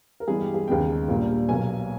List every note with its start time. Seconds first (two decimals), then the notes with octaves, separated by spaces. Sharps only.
0.20 A#4
0.27 G2 E3 G#3 B3 G#4
0.41 G4
0.54 G#4
0.68 D#2 C#3 G#3 B3 G5
1.08 A#1 A#2 G3 A#3
1.49 B1 B2 A#3 G#5